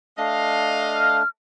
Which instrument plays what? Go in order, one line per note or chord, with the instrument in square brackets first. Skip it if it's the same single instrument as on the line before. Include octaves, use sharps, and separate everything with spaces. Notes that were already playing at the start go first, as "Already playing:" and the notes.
[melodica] A3 D4 [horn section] D#5 F5
[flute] F6